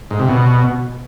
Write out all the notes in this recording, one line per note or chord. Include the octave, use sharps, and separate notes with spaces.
G#2
C3
B2